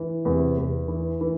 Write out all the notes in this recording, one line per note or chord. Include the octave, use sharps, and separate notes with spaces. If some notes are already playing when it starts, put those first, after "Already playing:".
Already playing: E3
E2 C3
E2
E3
E3